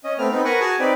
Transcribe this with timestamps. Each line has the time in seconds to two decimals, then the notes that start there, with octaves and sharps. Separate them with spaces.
0.04 C#4 D#5
0.18 A3 B3 C4 F6
0.31 B3 C4 D#4
0.45 A#4 B4 F#5 G#5 C#6
0.61 F#4 G#4 G#5 A5
0.79 C4 D#4 B4 D5